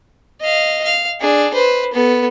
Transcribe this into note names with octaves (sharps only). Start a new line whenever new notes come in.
D#5 F5
F5
D4 G#4
B4 C5
B3 A4